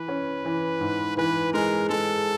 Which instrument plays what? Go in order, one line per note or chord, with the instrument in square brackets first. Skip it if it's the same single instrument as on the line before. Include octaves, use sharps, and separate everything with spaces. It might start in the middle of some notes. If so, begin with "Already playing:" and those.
Already playing: [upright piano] E3 [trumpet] B4
[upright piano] C#4
E3
G#2
[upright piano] E3 [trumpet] B4
[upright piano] G#3 [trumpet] A#4
[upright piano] G#3 [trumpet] A4